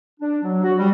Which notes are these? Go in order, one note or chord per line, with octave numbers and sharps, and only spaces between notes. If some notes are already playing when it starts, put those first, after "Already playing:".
D4
F#3
F#4
G3